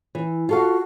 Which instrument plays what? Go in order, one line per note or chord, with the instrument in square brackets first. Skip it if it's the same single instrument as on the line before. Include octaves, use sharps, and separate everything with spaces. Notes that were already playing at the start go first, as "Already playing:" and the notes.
[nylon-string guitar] E3
[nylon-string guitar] F4 A4 F5 [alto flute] F#4